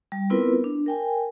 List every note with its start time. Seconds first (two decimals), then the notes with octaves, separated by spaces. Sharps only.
0.12 G3
0.30 B3 C4 E4 F4 A#4 B4
0.64 D4
0.86 A#4 G5 G#5